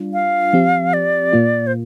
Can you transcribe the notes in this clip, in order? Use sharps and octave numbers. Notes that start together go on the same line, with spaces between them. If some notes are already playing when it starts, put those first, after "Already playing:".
Already playing: G3 D4 F4
F5
F3 C4 G4
D5
A#2 A#3 F4
C5